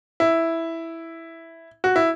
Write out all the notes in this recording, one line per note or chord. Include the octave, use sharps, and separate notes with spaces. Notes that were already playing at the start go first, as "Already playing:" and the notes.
E4
F#4
E4